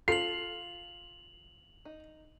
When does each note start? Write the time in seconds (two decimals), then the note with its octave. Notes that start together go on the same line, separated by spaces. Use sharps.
0.08 F4 A4 C7 F7 F#7
1.85 D#4